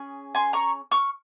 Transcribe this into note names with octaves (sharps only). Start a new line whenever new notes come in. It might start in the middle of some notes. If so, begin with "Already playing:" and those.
Already playing: C#4 G#4
G#5 C6
A#5 C#6
C#6 F6